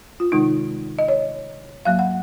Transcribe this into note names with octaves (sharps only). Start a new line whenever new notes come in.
F4
C3 D#3 G#3 D#4
D#5
C#5
G#2 F#3 A#3 F5
F#5